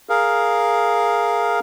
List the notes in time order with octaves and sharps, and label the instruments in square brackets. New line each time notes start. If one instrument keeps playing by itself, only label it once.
[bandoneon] G#4 A#4 F5